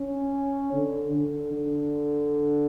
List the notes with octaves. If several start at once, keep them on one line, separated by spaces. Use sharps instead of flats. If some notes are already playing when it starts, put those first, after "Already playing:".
Already playing: C#4
D3
D3
D3